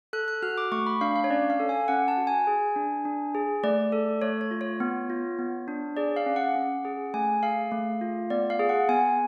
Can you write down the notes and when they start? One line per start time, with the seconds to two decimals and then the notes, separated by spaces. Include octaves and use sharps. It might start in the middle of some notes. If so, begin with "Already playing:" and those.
0.13 A4 F#6
0.28 F#6
0.42 F#4 F6
0.58 D6
0.72 A3 C#6
0.86 B5
1.01 D4 F5
1.16 F5
1.24 C#5
1.30 C#4 D5
1.50 F5
1.60 A4
1.69 G#5
1.88 C#4 F#5
2.08 A5
2.17 F#4
2.27 G#5
2.47 G#4
2.76 D4
3.05 D4
3.35 G#4
3.64 A3 D5
3.92 A4
4.22 A3 C#5
4.41 C#5
4.51 F4
4.61 C#5
4.80 B3
5.10 F4
5.38 B3
5.68 D4
5.97 G#4 D5
6.16 F5
6.26 C#4
6.36 F#5
6.55 C#4
6.85 G#4
7.14 A3 G#5
7.43 G#4 F5
7.72 A3
8.01 F4
8.30 B3 D5
8.50 F5
8.59 G#4
8.69 F#5
8.89 B3 G#5